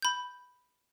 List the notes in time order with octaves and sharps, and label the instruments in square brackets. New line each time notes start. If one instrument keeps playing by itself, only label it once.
[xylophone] B5 G6